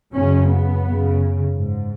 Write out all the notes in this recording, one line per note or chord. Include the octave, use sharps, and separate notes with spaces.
F#2 C#3 C#4
B3
F#2
C#3
G#2